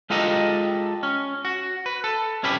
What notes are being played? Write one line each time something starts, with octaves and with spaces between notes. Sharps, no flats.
G#3 F4 G4 A4 D#5 A#5
C#4
F#4
B4
A4
C2 C#4 E4 G4 B4